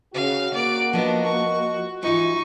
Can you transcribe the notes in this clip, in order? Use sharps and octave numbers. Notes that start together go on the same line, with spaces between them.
C#3 F#4 F5
A#3 D5 D7
F3 B3 D4 D#5
C#6
G#2 E3 D#4 F4 C#6